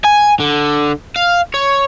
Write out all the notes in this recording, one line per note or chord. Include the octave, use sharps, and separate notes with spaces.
G#5
D3
F5
C#5